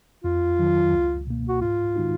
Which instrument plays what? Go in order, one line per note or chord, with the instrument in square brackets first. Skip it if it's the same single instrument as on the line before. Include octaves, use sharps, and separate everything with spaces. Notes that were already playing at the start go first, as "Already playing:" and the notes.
[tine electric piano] F2 [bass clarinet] F4
[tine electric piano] D#3 F#3
C#2
B2 A#3
[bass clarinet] F#4
[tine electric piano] G#2 [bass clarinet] F4
[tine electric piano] D#3 G#3 D#4 F#4